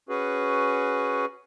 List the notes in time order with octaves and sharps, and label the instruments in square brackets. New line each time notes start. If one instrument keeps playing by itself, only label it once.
[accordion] C#4 F#4 G#4 B4